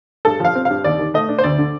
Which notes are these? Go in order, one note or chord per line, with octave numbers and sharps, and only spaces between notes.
G2 A4
F3 F5
C4
G2 F5
D#2 D5
D#3
A3 D#5
D4
C5
D2 D5
D3